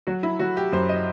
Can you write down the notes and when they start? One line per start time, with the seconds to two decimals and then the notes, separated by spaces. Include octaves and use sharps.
0.07 F#3 F#4
0.23 E4
0.39 F#3 F#4
0.57 G4
0.72 F#2 C5
0.89 D#5